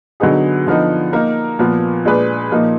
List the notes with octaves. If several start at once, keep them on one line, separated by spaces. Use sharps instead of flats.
D3 F#3 B3 D#4 G#4
D3 F3 B3 D#4
A#3 D#4 A#4
A#2 F3 B3
A#2 G#3 D4 G#4 B4
A#2 F3 A#3 D#4